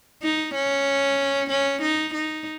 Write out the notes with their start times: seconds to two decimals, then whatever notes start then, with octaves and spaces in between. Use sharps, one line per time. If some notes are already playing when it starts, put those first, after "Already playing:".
0.23 D#4
0.54 C#4
1.50 C#4
1.82 D#4
2.14 D#4